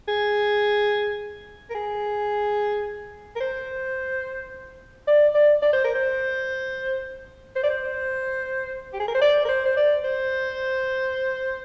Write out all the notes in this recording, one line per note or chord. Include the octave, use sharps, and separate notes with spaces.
G#4
A#4
G#4
A#4
C5
D5
D5
D5
C5
A#4
C5
C5
D5
C5
G4
G#4
A#4
C5
D5
A#4
C5
C5
D5
C5